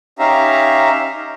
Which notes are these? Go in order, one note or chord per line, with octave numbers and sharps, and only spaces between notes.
C#4 D#4 G4 E5 F5 A#5